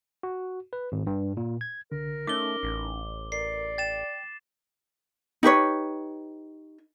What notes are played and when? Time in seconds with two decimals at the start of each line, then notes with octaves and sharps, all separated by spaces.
0.23 F#4
0.73 B4
0.92 G#1
1.07 G2
1.37 A#2
1.61 G#6
1.92 C2 D3 A#4
2.27 A3 C#4 D#4 D6 G7
2.63 A1
3.32 A#4 D5 C7
3.78 G5 A6 E7
5.43 D#4 G4 B4 C#5